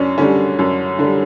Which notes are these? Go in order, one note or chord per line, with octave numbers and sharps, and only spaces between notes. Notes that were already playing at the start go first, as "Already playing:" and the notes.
Already playing: F#2 C#4 D4
D3 G3 C#4
F#2
D3 G3